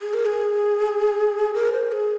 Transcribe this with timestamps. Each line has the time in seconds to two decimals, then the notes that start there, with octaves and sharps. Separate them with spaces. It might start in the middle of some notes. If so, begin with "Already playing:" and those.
0.01 G#4
0.14 A#4
0.26 G#4
1.54 A#4
1.73 C5
1.92 G#4